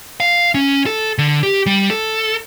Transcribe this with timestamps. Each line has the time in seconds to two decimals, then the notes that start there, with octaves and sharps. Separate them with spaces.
0.20 F5
0.55 C#4
0.86 A4
1.18 D3
1.43 G4
1.66 G3
1.90 A4